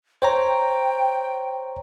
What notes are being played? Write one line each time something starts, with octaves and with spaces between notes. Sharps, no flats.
C5 C#5 G5 A#5